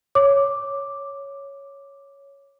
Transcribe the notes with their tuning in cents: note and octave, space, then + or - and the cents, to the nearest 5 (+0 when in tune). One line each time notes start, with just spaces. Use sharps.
C#5 +0 D6 +0